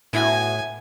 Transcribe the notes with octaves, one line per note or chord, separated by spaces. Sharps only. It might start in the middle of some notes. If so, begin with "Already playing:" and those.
A2 B3 E4 F#4 G#5